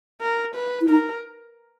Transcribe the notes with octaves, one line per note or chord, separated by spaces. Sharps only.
A#4
B4
E4
D#4 A#4